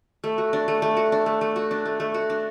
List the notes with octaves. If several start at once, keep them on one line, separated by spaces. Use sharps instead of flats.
A3
F#4
D4
A3
A3
F#4
D4
A3
A3
F#4
D4
A3
A3
F#4
D4